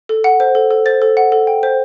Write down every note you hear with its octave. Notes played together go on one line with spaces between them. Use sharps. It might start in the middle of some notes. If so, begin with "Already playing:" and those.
A4
F#5
C5
A4
A4
C5 A6
A4
F#5
A4
G5
C5